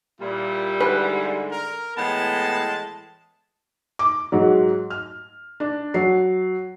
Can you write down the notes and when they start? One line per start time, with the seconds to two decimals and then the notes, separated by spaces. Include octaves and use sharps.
0.21 A#2 G3 E4
0.81 G#2 D3 B4
1.51 A#4
1.97 A2 E3 G#3 B3 A5
3.99 D6
4.32 G#2 F#3
4.90 F6
5.60 D4
5.94 F#3 C7